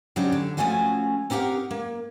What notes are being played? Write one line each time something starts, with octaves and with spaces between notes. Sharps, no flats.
C#3 F#3 C4 D4 D#4 G4
D3
F3 A3 C#4 F4 F#4 G#5
C4 D#4 G4 A#4 F5 F#5
A#3